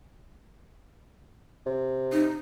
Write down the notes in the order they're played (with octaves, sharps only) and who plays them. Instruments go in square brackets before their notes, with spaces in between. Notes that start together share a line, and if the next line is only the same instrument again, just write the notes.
[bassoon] C3
[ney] D#4